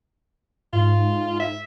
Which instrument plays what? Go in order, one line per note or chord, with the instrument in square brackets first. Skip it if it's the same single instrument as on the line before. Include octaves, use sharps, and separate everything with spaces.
[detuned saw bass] G#2 [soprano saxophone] F4
[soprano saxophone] E5